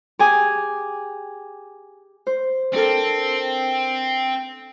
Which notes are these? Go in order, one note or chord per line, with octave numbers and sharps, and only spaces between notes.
G4 G#4 G#5
C5
C4 D4 A4 A#4